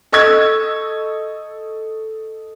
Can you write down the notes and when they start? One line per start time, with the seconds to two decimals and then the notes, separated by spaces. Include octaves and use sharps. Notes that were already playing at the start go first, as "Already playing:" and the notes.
0.12 A4 D#5 C#6 E6 G#6